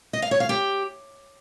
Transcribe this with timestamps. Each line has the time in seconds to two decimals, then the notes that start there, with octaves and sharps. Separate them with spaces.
0.13 D#5
0.22 F5
0.31 C#5
0.40 F5
0.49 G4